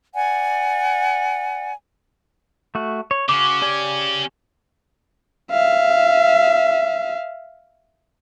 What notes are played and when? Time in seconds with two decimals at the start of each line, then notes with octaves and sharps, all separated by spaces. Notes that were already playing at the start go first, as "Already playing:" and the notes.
0.14 D5 F#5 G#5
2.75 A3 F#4
3.11 C#5
3.29 C#3 C#4 F#4 D6
3.62 G4 D5 G#5
5.52 E5 F5